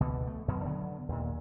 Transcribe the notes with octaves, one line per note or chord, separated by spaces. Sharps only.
C#2 B2 D3
A3
F#2 B2 F#3
D3 F#3 B3
D#2 A#2